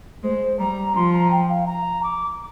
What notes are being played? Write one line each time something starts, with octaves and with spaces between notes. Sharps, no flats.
G#3 C5
G3 A#5
F3 C6
A#5
G5
F5
A#5
D6